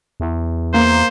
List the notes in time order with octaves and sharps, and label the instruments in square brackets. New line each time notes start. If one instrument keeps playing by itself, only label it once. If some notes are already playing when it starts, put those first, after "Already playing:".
[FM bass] E2
[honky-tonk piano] A#3 [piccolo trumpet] C5